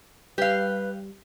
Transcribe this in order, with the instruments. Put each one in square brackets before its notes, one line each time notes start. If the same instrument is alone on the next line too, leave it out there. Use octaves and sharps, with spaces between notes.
[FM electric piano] G3 [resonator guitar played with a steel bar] G4 F5 [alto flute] B4